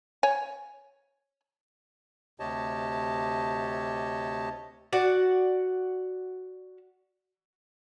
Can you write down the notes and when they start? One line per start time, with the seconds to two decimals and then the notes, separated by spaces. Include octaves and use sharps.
0.23 C#5 G#5
2.40 D2 C3 G4 C#5 D#5 A5
4.93 F#4 D5 F#5